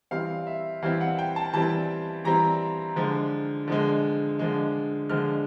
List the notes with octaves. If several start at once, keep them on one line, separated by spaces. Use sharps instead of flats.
E3 G3 C4 F5
E5
E3 G3 C4 F5
F#5
G5
A5
E3 G3 C4 A5
E3 G3 C4 A#5
D3 F3 G#3
D3 F3 G#3
D3 F3 G#3
D3 F3 G#3 F6